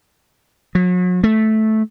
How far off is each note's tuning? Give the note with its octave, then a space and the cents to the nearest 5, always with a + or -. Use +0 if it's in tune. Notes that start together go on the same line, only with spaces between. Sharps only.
F#3 -40
A3 -10